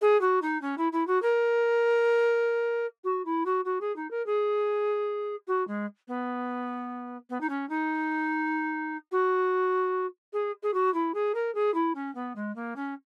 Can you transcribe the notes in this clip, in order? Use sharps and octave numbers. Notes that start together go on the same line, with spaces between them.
G#4
F#4
D#4
C#4
E4
E4
F#4
A#4
F#4
E4
F#4
F#4
G#4
D#4
A#4
G#4
F#4
G#3
B3
B3
D#4
C#4
D#4
F#4
G#4
G#4
F#4
E4
G#4
A#4
G#4
E4
C#4
B3
G#3
A#3
C#4